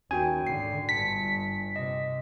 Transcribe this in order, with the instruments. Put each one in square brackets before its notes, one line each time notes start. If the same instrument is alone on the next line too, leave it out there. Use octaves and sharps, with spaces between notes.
[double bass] D#2 [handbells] C#4 F#4 G5 [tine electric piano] G#5
[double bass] G#2 D3 [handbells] C7
[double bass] G1 G2 [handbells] A5 C#7 [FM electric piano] B6
[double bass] C3 [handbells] D#5